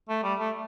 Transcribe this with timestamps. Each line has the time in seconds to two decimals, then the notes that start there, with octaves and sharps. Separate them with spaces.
0.09 A3
0.23 G3
0.39 A3